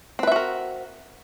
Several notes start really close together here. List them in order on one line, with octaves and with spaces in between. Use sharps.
C4 B4 E5 F#4 A#4